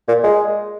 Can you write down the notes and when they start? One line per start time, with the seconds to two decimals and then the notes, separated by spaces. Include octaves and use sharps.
0.08 A#2
0.23 G#3